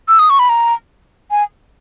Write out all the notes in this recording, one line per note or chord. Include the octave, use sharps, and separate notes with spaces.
E6
D#6
C#6
B5
A#5
G#5